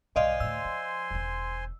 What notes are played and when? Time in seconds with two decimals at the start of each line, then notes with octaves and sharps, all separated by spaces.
0.16 B1 G2 C5 D5 D#5 F5 G#5 C6
0.40 D2 A2 E6
0.65 F3
1.11 E1 D#3